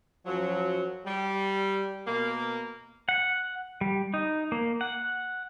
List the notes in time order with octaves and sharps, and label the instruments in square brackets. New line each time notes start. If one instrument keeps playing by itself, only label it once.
[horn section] F#2 F3 F#3
G3
B2 A#3
[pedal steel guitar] F#5
G3
D#4
A#3
F#5